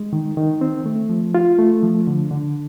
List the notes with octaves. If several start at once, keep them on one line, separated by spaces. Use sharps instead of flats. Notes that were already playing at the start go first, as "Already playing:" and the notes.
Already playing: G#3
D#3
D#3
C4
A3
F3
F4
A3
F3
D3
D3